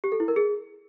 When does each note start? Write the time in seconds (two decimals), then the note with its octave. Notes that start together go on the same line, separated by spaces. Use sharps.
0.04 G4
0.12 A4
0.20 E4
0.28 A#4
0.36 G#4